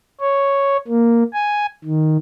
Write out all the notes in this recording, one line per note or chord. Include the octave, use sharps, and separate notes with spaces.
C#5
A#3
G#5
D#3